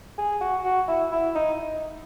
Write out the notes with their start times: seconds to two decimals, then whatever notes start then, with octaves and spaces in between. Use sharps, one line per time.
0.18 G#4
0.40 F#4
0.65 F#4
0.88 E4
1.12 E4
1.35 D#4